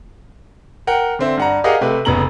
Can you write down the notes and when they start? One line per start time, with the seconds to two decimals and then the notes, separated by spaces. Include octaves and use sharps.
0.87 A#4 F#5 G5
1.19 D3 C4 E5
1.37 G2 F#5 A#5
1.64 G4 G#4 A#4 D#5 F5 F#5
1.81 C3 A3 B4
2.05 F1 C#3 B3 A#5 F#7